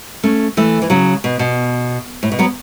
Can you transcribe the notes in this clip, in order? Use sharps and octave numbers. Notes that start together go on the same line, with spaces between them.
A3 C#4
E3 A3
E3
C#3 F#3
B2
B2
A2
B2
F#3 B3